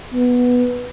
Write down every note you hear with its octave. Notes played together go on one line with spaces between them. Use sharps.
B3